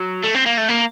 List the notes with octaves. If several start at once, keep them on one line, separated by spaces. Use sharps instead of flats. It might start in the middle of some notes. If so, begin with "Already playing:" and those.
Already playing: F#3
A3
C4
A#3
A3
A#3